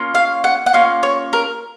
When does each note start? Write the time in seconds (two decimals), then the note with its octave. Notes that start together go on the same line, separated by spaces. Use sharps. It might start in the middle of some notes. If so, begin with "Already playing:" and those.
Already playing: A#3 C#4 F4
0.15 F5
0.44 F#5
0.66 F#5
0.73 A#3 C#4 F4 F5
1.03 C#5
1.33 A#4